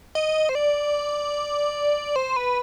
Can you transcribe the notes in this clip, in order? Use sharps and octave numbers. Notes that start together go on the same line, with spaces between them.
D#5
C5
D5
C5
B4